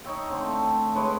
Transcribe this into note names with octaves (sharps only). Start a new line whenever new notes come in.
D#4 C#5 E5 G5
D3 A3 C4
A3
A2 G#3 B4 C#5